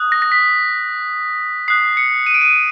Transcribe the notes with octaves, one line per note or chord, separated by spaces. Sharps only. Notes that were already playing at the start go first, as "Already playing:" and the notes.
Already playing: D#6 F#6
A#6
A#6
B6
D#6 F#6 C7
C#7
D#7
D7
D#7